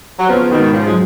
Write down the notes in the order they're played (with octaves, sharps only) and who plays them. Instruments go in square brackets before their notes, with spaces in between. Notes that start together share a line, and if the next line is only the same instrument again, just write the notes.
[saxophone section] F#3
[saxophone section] C#3 F3 [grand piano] B3
[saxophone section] B2 D#3
[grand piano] G#2
[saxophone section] C#3 F3
[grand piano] F#3 [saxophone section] G#3